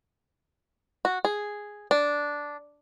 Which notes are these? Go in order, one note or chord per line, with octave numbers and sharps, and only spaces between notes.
F#4
G#4
D4